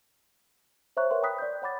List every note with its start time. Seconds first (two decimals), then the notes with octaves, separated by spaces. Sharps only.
0.97 C5 C#5 E5 A#5 C#6 F#6
1.11 A#4 B4 C#5 E5 F#5 C6
1.22 G5 A#5 B5 D#6 F#6 B6
1.39 D5 G6
1.62 C#5 F#5 B5 D6 A6